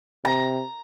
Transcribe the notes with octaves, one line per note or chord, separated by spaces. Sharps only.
C3 A#5